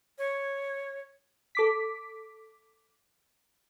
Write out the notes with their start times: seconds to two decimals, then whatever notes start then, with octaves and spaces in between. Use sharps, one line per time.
0.18 C#5
1.55 A4 D6 B6